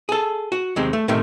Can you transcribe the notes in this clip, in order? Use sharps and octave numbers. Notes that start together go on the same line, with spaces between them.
G#4 A4
F#4
D#2 C3 G#3 C4
A3
A2 C3 D#3 A3